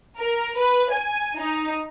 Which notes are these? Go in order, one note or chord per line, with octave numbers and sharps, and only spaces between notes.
A#4
B4
G#5
D#4